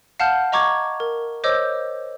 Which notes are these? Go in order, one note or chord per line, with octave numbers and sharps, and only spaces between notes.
F5 F#5 A5 F6 G6
D#5 A#5 C#6 D6 G#6
A#4
C5 C#5 D#5 D6 E6 G6